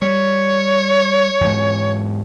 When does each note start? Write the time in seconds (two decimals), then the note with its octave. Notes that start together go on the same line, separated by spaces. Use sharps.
0.02 G3 C#5
1.41 E2 G#2